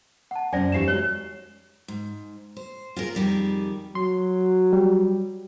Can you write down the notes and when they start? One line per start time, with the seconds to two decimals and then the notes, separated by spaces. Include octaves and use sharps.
0.31 F#5 A5
0.53 F#2 C3 C#4 C5 D5 G#5 A#6
0.72 E2 F3 D#4 G4 C5 C7 E7
0.88 G#3 C#4 F#4 C#5
1.88 G#2
2.57 C5
2.96 F4 G#4 A#4
3.15 F2 D#3 G3 G#4
3.95 F#3 C6
4.73 G3